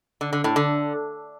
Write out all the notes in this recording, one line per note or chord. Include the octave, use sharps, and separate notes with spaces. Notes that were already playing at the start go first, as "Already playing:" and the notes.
D3
D3
A2
D3